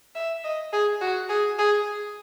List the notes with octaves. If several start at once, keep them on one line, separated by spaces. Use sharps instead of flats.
E5
D#5
G#4
F#4
G#4
G#4